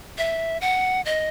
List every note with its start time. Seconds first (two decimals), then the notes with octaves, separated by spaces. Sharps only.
0.18 E5
0.61 F#5
1.06 D#5